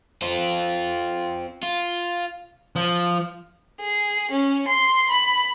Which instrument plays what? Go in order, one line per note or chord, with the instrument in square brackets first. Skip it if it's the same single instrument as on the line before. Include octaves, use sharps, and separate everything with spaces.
[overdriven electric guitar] C4 F4
F4
[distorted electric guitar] F3
[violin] G#4
C#4
C6
B5